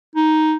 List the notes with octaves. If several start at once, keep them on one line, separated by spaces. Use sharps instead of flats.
D#4